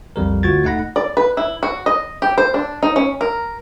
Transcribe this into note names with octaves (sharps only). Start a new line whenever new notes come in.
B1 F2 G3 A#4
D2 F4 F#4 G#6 A6
A3 D#4 D#5 F#5 B5 A#6
D5
B4
E4
F#4
D#5
G4
C5
D4
D#4
C#4
A#4